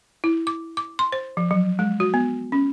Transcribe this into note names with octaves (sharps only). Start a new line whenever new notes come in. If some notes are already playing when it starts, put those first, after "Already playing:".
E4
D6
D6
C6
C5
F3
F#3
G#3
F#4
B3
C#4